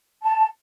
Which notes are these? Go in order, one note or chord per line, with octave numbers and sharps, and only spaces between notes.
A5